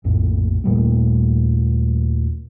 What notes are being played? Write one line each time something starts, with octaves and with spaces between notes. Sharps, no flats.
A#1 F2 A2
D#2 A#2 G3 A3